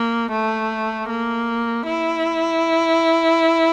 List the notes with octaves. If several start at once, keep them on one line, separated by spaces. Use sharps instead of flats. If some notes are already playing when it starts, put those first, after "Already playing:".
Already playing: A#3
A3
A#3
E4